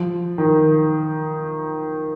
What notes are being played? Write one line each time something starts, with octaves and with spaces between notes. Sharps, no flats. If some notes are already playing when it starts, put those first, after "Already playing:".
Already playing: F3
D#3